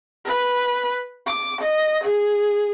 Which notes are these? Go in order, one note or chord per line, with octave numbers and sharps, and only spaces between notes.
B4
D6
D#5
G#4